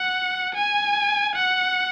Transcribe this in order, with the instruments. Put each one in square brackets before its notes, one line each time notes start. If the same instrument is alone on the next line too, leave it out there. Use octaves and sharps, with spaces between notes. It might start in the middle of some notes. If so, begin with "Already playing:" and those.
Already playing: [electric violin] F#5
G#5
F#5